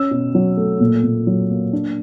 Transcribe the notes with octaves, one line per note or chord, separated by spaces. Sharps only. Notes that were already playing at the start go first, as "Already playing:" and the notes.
Already playing: C#4 E6
B2
F#3
A3
A#2
A#2
F#3
A#3
D4